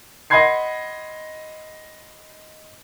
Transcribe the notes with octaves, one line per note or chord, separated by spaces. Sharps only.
D#5 F#5 B5 C6 G#6 C7